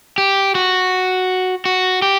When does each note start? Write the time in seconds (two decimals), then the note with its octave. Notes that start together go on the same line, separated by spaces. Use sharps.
0.18 G4
0.55 F#4
1.65 F#4
2.02 G4